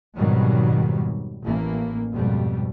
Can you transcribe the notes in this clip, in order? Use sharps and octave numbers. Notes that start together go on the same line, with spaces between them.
F2 G#2 B2 D#3 F#3 G3
A1 E3 A#3
F2 G#2 B2 G3